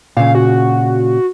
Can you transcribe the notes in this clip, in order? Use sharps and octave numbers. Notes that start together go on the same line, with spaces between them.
A#2 C#3 F5
F#4